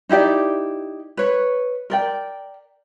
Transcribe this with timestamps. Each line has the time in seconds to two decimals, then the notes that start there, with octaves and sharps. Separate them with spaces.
0.09 D#4 E4 G4 D5
1.17 B4 C#5
1.90 A#4 D5 G5